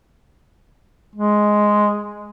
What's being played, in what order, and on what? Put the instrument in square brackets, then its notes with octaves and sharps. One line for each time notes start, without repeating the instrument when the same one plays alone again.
[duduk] G#3